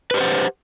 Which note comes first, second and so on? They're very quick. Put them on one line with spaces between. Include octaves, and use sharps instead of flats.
B4 G4 C5 F#5